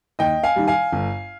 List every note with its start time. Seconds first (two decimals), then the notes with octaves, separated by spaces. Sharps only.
0.19 D#2 D#5 G5
0.43 F5 G#5
0.56 D#3 G3
0.67 F5 G#5
0.93 G1